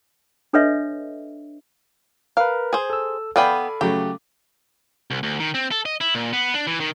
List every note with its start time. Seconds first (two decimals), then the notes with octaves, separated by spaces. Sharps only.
0.53 D4 A4 B4 C#5 D#5 E5
2.37 A#4 B4 F5
2.73 G#4 C5
2.90 A4 E6
3.36 B3 A4 B4 D5 F5 G5 G#5 B5
3.81 C#3 F#3 A3 G4
5.10 C2
5.23 D2
5.40 D#3
5.54 C4
5.71 A4
5.86 D#5
6.01 E4
6.15 A#2
6.33 B3
6.54 D4
6.67 E3
6.80 D#3